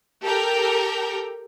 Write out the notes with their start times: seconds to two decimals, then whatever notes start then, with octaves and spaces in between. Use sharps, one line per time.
0.23 G4 A4 A#4 G5